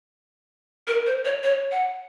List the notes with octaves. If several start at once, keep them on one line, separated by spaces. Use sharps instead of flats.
A#4
C5
C#5
C#5
F#5